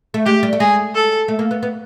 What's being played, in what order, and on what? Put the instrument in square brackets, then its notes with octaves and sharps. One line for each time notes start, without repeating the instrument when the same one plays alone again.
[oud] A3
[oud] G#3 [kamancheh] G4
[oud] G3
A3
[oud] G#3 [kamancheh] G#4
[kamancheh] A4
[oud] A3
A#3
B3
B3